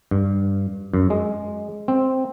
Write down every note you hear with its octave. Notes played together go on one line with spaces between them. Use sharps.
G2
F#2
G#3
C4